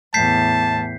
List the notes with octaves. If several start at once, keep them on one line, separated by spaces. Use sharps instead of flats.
E2 A2 A5 G6 B6 C7